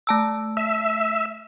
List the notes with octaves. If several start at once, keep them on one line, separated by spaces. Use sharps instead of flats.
A3 A5 E6
E5